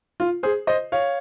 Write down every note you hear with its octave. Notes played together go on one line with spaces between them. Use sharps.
F4
G#4 C5
C5 D#5
C#5 F5